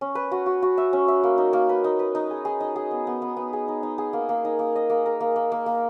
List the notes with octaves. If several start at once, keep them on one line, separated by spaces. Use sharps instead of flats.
C#4
B4
F#4
F#4
F#4
E5
C#4
E5
A#3
D#4
A#3
B4
D#4
B4
D#4
G#4
G#4
D#4
G#4
B3
B3
B3
B3
G#4
D#4
D#4
G#4
A#3
A#3
D#4
A#3
D#5
A#3
A#4
A#3
A#3
A#3
A#3